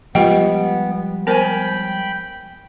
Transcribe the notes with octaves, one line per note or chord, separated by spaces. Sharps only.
F3 G3 G#3 B3 F4 G4 D#5 G5
B3 A#4 C5 C#5 G5 G#5 B5